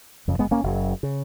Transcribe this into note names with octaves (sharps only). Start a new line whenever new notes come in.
F#1 F2 C#3
G#3 B3
A#3 C#4
F#1 F#2 C#3
C#3